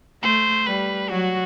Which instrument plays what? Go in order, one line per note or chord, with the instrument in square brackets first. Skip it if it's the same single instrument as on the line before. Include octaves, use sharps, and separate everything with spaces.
[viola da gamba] A3 [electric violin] C5
[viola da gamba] G3 [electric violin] B4
[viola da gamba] F#3 [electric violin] F#4